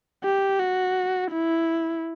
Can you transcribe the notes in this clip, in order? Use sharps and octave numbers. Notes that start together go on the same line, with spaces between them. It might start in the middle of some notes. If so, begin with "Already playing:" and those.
G4
F#4
E4